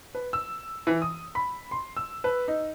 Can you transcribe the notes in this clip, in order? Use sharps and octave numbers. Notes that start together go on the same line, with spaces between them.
B4
E6
E3
D#6
B5
C6
E6
B4
D#4